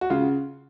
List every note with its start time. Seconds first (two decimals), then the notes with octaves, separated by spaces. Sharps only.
0.01 F#4
0.10 C#3 F4